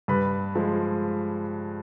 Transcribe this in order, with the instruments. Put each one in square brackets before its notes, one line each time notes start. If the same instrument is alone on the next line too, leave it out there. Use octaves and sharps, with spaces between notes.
[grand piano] G2 B4 B5
F3 G#3